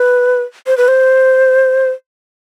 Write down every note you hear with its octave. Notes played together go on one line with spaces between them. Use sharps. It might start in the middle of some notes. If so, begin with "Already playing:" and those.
Already playing: B4
C5
B4
C5